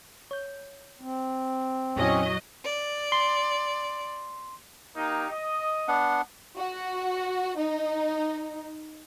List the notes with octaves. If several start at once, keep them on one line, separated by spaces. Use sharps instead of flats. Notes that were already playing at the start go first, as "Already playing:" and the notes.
C#5 G6
C4
F2 A#2 F#3 C#4 E4 D#5
D5
C6
A#3 D#4 G4
D#5
B3 D4 F#5
F#4
D#4